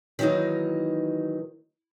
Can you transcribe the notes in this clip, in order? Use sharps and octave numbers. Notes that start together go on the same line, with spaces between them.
D#3 E3 F#3 A#3 D#4